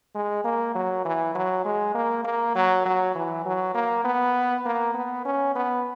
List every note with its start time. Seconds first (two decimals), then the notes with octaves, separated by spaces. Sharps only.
0.15 G#3
0.44 A#3
0.75 F#3
1.05 E3
1.35 F#3
1.65 G#3
1.95 A#3
2.25 A#3
2.55 F#3
2.85 F#3
3.15 E3
3.45 F#3
3.74 A#3
4.04 B3
4.66 A#3
4.94 B3
5.25 C#4
5.55 B3